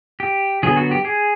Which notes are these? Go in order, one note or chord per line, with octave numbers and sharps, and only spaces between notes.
G4
D3 F#3 B3 G#4
F#4
G4
G#4